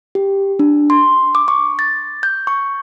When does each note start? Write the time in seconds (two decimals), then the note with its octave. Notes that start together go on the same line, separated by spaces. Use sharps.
0.15 G4
0.59 D4
0.90 C6
1.35 D6
1.48 C#6
1.79 A6
2.23 G6
2.47 C#6